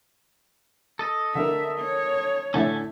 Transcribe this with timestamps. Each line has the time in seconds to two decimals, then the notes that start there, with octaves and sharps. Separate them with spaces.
0.99 A4 D#5
1.35 D3 A#4 E5
1.79 C#5
2.54 A2 D3 C#4 A4 E5 G#5